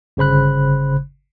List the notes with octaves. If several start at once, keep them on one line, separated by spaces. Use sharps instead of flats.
G1 C#3 C5 B5 F#6